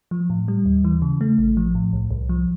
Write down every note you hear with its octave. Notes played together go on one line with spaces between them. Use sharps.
F3
A2
G3
D#2
E3
C#3
A3
A1
F3
A2
C2
C2
F3